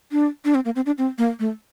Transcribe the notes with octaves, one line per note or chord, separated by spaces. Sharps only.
D4
D4
C4
A#3
C4
D4
C4
A#3
A3